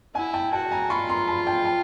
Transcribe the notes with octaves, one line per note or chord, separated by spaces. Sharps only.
E4 F#5 G#5
G5 A5
F#4 G5 A5
G#5 A#5
F4 B5 C#6
A#5 C6
A5 B5
G5 A5
G5 A5